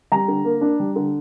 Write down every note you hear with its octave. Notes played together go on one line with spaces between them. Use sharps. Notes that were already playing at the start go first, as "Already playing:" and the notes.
G3 A#5
D3
A#3
D4
G3
D3